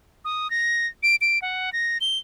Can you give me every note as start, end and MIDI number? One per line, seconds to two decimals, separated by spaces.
0.25 0.50 87
0.50 0.87 94
1.03 1.16 98
1.21 1.41 98
1.42 1.72 78
1.73 1.98 94
2.01 2.18 103